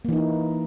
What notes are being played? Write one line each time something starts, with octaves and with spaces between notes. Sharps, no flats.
E3 A#3 D#4 E4